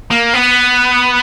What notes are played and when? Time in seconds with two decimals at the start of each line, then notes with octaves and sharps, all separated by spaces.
0.11 A#3
0.34 B3